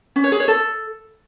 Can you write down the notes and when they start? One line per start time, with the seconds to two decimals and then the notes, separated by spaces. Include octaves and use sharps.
0.16 C#4
0.24 C#5
0.32 G#4
0.40 C#5
0.48 A4